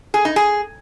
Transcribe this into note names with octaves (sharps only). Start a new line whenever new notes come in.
G#4
D#4
G#4